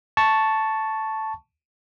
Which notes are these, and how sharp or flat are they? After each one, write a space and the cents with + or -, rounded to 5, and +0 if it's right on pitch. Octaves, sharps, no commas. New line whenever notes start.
A5 +0 C#6 +0